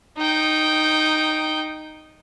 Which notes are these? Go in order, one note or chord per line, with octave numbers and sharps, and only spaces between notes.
D#4 G5